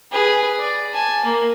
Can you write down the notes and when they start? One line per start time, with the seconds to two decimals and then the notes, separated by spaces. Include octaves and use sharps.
0.12 G#4 B4
0.59 D5
0.93 G#5 A5
1.24 A#3